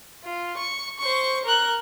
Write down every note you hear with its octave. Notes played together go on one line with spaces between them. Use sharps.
F4
C#6
C5 C#6
A#4 F#6